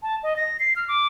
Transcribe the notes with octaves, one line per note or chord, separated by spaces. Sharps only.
A5
D#5
A#6
C7
F6
D6